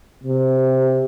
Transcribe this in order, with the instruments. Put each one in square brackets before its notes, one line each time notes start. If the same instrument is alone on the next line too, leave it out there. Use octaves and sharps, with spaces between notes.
[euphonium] C3